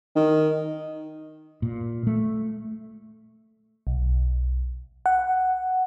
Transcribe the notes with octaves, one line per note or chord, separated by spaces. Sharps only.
D#3
A#2
A3
B1
F#5